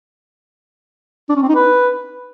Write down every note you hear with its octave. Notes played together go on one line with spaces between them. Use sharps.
D4
C#4
C4
D#4
B4